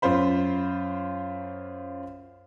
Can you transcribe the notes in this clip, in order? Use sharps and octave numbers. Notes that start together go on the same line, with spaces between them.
F#2 C#4 F4 C5 B5